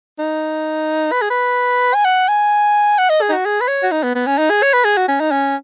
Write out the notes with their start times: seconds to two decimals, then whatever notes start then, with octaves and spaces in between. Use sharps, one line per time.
0.19 D#4
1.12 B4
1.21 G#4
1.30 B4
1.94 G#5
2.05 F#5
2.28 G#5
2.99 F#5
3.09 D#5
3.22 G#4
3.29 D#4
3.33 F#4
3.46 G#4
3.61 B4
3.68 C#5
3.83 F#4
3.91 D#4
4.03 B3
4.15 B3
4.26 C#4
4.38 D#4
4.50 G#4
4.62 C#5
4.73 B4
4.85 G#4
4.97 F#4
5.08 C#4
5.20 D#4
5.31 C#4